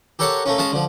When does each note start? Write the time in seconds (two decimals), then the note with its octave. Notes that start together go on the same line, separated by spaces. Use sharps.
0.19 G4 A4 A#4 C#5 F#5 A5
0.46 A3 A#3 C#4
0.58 G#3 C#4 F5 A5
0.72 D3 F3